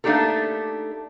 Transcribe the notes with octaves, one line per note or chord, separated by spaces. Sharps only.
A3 A#3 D4 D#4 G4 A4